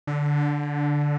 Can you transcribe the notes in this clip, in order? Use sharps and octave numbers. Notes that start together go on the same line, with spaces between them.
D3